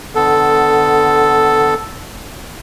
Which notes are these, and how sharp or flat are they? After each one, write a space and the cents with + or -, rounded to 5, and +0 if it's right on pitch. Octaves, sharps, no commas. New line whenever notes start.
D3 +15 B3 +15 A4 +0